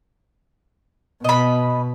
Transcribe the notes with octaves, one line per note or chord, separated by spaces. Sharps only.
B2 D#5 B5